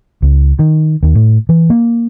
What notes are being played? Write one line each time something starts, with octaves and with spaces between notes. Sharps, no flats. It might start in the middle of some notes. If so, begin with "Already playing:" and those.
C#2
D#3
D#2
A2
E3
A#3